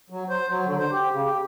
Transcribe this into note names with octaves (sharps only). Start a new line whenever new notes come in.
F#3
C5
F#3
D3
C5
G4
C#3
G4